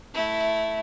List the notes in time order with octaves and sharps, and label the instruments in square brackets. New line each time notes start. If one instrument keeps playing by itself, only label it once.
[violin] A3 E4